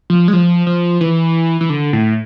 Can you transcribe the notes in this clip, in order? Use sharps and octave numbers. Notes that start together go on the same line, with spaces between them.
F3
G#3
F3
F3
E3
E3
D3
A2